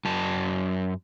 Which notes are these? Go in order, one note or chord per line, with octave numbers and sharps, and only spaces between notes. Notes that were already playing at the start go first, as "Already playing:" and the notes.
F#2 A5